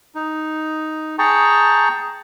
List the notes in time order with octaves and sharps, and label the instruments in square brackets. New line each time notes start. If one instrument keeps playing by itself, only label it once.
[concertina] D#4
G#4 G5 A5 A#5 C#6